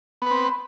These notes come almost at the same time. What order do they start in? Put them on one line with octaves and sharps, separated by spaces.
B3 B4 C4